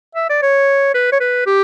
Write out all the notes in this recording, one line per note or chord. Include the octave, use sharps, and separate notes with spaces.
E5
D5
C#5
B4
C#5
B4
G4